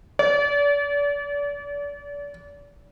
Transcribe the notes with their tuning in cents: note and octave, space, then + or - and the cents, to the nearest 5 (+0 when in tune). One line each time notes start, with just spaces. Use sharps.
D5 -35